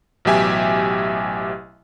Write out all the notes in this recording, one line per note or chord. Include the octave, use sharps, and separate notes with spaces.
A1 B2 F#3 G4 E5 G#5